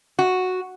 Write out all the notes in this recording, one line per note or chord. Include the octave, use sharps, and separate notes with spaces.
F#4